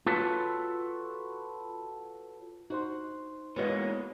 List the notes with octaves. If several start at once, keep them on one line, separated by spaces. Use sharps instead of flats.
F4 F#4 A4 B4 C#5
D#4 F#4 C5 C6
E3 G#3 A#3 B3 F#4 C#5 D#5